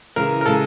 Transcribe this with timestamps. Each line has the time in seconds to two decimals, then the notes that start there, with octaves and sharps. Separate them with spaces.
0.16 C#3 E3 G#3 A#4
0.41 A#4
0.46 C#3 E3 G#3 A4